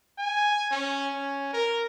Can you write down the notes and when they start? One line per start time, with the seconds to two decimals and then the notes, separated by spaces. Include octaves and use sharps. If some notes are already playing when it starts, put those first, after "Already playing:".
0.18 G#5
0.71 C#4
1.14 C#4
1.53 A#4